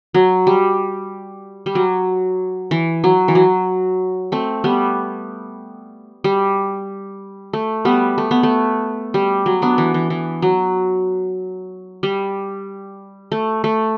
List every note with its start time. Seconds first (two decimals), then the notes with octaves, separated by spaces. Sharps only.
0.14 F#3
0.47 G3
1.66 G3
1.75 F#3
2.71 E3
3.04 F#3
3.28 E3
3.35 F#3
4.32 A3 C4
4.64 G3 B3
6.24 G3
7.53 A3
7.85 G3 B3
8.18 A3
8.31 B3
8.43 A3
9.14 G3
9.46 F#3
9.62 B3 D4
9.78 E3
9.94 E3
10.10 E3
10.42 F#3
12.03 G3
13.32 A3
13.64 A3